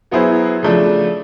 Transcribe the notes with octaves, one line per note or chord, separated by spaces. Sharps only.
F#3 B3 E4 G#4 C5
C#3 F3 A3 D4